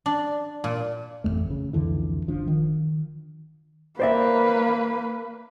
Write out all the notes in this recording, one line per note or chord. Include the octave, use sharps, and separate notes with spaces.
D4
A#2
A1 F2 A2 A3
C#3
C2 F2 D3 E3
F#1 F3 D4
D#3
A#3 B4 C5 D5 E5